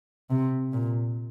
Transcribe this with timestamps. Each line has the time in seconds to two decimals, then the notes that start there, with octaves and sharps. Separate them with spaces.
0.30 C3
0.73 A#2